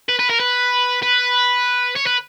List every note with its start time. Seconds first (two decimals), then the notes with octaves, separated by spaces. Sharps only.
0.09 B4
0.19 B4
0.30 A#4
0.40 B4
1.03 B4
1.96 C#5
2.07 B4